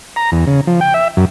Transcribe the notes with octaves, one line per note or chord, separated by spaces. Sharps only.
A#5
E2
C#3
F3
G5
E5
F#2